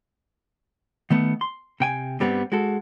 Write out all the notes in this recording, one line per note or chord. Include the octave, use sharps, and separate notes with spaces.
D#3 A3 B3
C6
C3 G5 G#5
G2 G3 B3 C4
G#3 F#4 A4